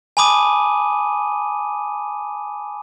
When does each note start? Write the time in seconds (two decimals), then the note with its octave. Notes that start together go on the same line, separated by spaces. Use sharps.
0.17 G#5 A5 B5 D6 D#6 D#7